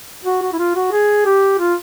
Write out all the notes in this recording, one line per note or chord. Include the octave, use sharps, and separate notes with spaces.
F#4
F#4
E4
F4
F#4
G#4
G4
F4